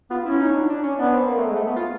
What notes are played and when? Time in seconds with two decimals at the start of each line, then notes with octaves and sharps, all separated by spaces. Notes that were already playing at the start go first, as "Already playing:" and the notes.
0.10 B3 F4
0.25 C#4 E4
0.40 D#4
0.54 D4
0.70 D4
0.83 C#4
0.98 B3 D4
1.14 C4
1.28 A#3
1.37 A3
1.47 G#3
1.56 A3
1.67 B3
1.76 F4